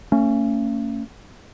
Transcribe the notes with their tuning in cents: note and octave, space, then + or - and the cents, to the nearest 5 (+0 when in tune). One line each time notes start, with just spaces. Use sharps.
A3 +45 C#4 +0